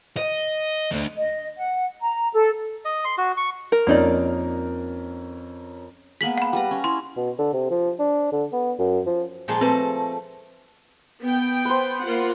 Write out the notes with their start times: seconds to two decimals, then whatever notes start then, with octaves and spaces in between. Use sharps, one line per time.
0.17 D#5
0.91 A3 D4
1.17 D#5
1.57 F#5
2.00 A#5
2.33 A4
2.85 D#5
3.05 C6
3.18 F#4
3.37 C#6
3.72 A#4
3.87 F2 A#3 C#4 D#4 A#4 D5
6.21 G#3 A#3 B3 B6 F#7
6.38 F#5 B5
6.53 G3 B4 A#5
6.71 C#4
6.84 E4 C6
7.17 B2
7.39 D3
7.53 C3
7.70 F3
7.99 D4
8.32 D3
8.52 B3
8.79 F#2
9.06 F3
9.48 A#2 F3 G#3
9.61 A3 C4 B4 A5
11.22 B3 G5
11.65 B4 C5
12.03 A#3 F4 F#5